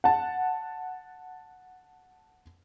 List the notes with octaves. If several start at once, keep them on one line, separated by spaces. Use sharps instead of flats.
F#5 A5